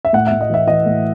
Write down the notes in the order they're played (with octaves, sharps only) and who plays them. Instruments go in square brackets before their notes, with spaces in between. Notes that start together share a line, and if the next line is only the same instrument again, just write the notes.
[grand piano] E5
A2 F#5
A2 E5
D#5
E3 E5
E3 D#5
A2